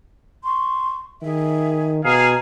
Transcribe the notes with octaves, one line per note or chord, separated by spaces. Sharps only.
C6 C#6
D#3 G#4 E5 G#5
B2 G#4 F5 A#5